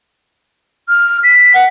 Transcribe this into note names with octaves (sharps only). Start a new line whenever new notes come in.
F6
B6
F#5